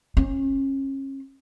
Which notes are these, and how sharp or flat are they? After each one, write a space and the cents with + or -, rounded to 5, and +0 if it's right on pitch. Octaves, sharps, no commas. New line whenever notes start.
C#4 -35